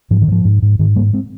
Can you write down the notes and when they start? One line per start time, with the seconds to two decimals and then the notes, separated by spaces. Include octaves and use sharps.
0.11 G#2 F3
0.22 D#3
0.27 G#2 F3
0.45 G#2
0.62 G#2
0.79 G#2 D#3
0.96 G#2 G3 A#3
1.13 G#3 C4